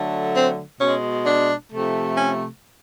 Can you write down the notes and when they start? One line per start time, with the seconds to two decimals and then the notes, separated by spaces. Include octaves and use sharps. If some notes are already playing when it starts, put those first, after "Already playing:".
Already playing: D3 F#3 A3
0.34 C4
0.80 B2 G#3 C#4
1.26 D4
1.72 C3 F3 A3
2.18 C#4